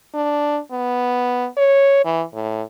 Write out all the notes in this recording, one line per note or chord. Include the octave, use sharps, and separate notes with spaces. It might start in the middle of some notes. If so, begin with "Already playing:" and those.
D4
B3
C#5
E3
A2